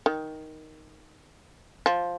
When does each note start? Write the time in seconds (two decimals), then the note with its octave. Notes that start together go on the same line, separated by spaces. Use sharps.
0.06 D#3
1.86 F3